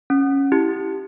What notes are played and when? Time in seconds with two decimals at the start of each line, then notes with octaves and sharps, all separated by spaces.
0.10 C#4
0.52 E4 G4